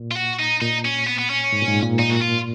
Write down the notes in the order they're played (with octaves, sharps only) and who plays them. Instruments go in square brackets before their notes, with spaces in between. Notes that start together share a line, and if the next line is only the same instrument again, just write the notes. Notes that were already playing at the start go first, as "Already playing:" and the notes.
Already playing: [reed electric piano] A#2
[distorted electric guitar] F4
F#4
D#4
[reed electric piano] A#2 [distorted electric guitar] D#4
[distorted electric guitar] C#4
B3
B3
C#4
[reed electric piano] G#2
A#2
G#2
A#2
[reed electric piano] A#2 [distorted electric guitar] D#4
[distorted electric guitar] F#4
F4